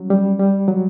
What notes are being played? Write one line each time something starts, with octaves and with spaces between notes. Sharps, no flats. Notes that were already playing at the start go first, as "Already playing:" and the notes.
Already playing: F#3 G3 C#4
G3
G3
F#3